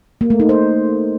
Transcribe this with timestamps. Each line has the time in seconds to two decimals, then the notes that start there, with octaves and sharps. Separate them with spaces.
0.21 A#3
0.30 A3
0.40 D#4
0.49 C5